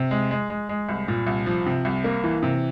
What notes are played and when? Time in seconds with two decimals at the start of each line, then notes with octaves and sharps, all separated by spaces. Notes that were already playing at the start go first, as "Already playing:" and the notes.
Already playing: C3
0.11 G#3
0.31 G#3
0.50 G#3
0.69 G#3
0.89 C2
1.08 A#2
1.27 C2
1.46 F3
1.66 C3
1.85 C2
2.04 A#3
2.24 E3
2.43 C3